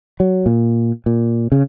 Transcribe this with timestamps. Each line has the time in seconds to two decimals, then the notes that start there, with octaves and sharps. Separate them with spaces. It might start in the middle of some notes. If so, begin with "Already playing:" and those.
0.20 F#3
0.46 A#2
1.06 A#2
1.52 C#3